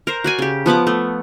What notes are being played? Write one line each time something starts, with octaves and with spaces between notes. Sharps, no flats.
A#4 C5
F#4 D5 G#5
C#3 G4
F3 B3 F#5 D6
A3